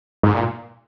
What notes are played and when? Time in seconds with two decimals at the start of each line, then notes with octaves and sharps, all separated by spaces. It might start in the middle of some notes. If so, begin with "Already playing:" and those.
0.23 G#2
0.34 A#2